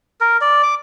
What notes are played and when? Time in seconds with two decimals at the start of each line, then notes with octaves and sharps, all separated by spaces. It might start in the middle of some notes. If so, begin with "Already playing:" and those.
0.21 A#4
0.41 D5
0.63 D6